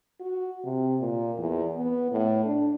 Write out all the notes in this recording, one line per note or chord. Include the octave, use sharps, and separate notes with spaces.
F#4
C3
A#2
E2
B3
A2
D4